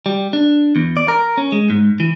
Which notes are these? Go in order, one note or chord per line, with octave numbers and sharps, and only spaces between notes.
G3
D4
E2
D5
A#4
C#4
G#3
G#2
E3